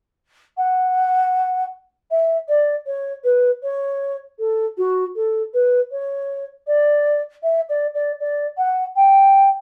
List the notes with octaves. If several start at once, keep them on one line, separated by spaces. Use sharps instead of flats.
F#5
E5
D5
C#5
B4
C#5
A4
F#4
A4
B4
C#5
D5
E5
D5
D5
D5
F#5
G5